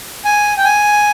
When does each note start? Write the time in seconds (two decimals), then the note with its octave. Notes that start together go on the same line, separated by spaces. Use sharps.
0.25 G#5
0.57 G5
0.65 G#5